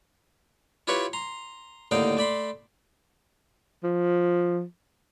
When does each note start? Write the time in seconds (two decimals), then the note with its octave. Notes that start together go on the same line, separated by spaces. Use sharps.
0.87 E4 F4 G4 B4 C#5 C#6
1.13 A#5 C6
1.91 D#2 A2 D3 D#4 F5 G5
2.17 A3 D5 B5 C6
3.84 F3